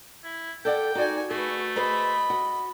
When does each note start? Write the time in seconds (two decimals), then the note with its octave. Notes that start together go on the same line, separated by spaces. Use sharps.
0.24 E4
0.65 A4 D5 F#5 G5
0.95 D#4 F#4 D5 G#5
1.31 A3 F#4 G#4 B4
1.76 G#4 B4 C5 D#5 B5
2.30 F#4